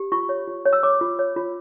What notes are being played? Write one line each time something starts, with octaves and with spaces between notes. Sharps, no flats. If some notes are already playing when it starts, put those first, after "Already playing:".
Already playing: G4
F4 C#6
C#5
F4
C#5
E6
C#5 D6
F4
C#5
F4